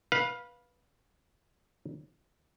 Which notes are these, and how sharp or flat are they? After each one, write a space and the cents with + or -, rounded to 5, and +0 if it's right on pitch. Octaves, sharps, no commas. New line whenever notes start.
B4 -15 F5 +15